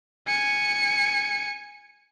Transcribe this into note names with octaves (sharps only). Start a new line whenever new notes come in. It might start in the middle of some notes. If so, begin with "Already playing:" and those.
G#5 C#7